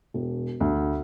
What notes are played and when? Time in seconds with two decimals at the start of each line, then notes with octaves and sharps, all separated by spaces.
0.14 E1
0.60 D2